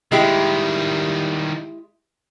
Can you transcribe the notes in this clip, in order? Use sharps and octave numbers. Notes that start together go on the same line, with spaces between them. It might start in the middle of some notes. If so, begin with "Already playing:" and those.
D#3 G3 G#3 E4 G4